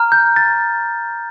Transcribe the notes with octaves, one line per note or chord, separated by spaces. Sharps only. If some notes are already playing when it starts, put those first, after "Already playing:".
Already playing: A#5 F6
G6
A6